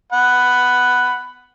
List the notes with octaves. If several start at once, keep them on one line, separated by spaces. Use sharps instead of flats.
F#5 B5